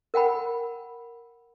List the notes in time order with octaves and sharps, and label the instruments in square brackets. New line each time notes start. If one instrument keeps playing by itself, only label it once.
[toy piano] A#4 F#5 G5 B5